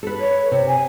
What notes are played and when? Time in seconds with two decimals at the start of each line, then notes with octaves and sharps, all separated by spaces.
0.03 A4 B4
0.20 C#5
0.51 C3 C#5
0.67 G#5